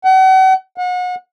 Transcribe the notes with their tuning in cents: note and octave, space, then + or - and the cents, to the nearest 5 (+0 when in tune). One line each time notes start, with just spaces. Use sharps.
F#5 +40
F#5 -35